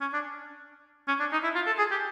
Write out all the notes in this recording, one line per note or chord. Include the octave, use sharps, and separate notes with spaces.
C#4
D4
C#4
D4
D#4
E4
F4
A4
G#4
G4